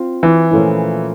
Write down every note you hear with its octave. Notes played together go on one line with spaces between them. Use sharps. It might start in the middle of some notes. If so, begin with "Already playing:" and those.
Already playing: C4 F4
E3
A#2 F3 A3 C#4 E4